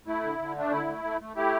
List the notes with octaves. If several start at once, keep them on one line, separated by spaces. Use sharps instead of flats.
A3 E4
D3
D3
A3 D4
D3 E4
A3
A3
A3
A3 E4 G4